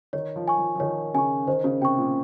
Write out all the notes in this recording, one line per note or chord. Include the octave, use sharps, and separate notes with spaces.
D#3 C#5
F3
G#5 C#6
F3
F3
D#3 C#5
C#3 G#5 C#6
D#3 C5
C#3
C3 G5 C#6
A#2